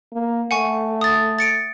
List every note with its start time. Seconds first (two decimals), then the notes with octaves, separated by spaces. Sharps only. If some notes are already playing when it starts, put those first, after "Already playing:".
0.12 A#3
0.51 A3 F#5 G#5 C#6
1.01 D#6 A6
1.39 A6 C#7 D7